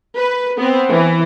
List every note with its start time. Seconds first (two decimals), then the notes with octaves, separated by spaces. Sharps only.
0.16 B4
0.57 B3 C4
0.90 E3